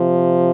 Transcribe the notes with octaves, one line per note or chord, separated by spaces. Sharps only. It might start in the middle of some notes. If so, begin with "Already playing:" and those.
Already playing: C3 F3